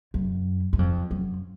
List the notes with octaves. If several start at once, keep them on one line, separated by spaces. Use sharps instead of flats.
F#2
F#2
F2
F#2